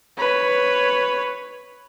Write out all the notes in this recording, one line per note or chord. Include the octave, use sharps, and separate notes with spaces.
B4 C#5